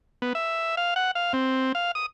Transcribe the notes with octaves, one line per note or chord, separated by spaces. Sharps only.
B3
E5
F5
F#5
F5
C4
F5
D#6